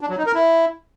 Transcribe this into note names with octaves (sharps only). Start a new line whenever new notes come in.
D4
F#3
D#4
A#4
E4